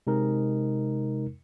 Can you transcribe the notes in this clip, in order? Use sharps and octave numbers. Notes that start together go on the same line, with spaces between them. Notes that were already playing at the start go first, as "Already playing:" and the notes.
C3 G#3 D#4 A#4